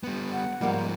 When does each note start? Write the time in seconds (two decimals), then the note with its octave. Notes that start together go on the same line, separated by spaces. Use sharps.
0.03 G3 B3
0.33 F#5
0.61 G#2 F3 G3 A#3 G4